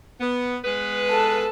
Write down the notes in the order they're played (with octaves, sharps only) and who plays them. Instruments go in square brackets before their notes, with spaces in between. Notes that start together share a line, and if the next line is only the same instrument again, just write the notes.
[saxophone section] B3
G#3 B3 B4
[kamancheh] A4 A5